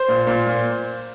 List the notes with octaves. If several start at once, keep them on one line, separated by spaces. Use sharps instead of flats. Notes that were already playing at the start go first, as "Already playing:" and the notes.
Already playing: C5
A#2
A#2
A#2